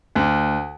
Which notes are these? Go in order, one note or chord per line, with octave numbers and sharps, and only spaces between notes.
D2